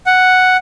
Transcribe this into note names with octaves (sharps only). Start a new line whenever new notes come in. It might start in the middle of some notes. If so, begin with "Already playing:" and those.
F#5